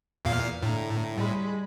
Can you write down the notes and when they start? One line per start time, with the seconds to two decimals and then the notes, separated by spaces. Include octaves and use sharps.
0.25 E2 A#2 F5
0.63 A2 D3 A#5
1.14 G3 G#3 B5